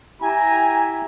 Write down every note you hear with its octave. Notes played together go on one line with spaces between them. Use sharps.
E4 G4 E5 G#5 A#5